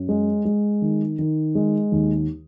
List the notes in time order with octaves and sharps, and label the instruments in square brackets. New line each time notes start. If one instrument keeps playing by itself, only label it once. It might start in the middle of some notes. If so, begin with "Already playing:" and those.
Already playing: [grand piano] F#2
G#3
G#3
D#3
D#3
G#3
D#2